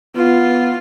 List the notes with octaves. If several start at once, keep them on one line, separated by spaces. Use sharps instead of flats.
B3 F4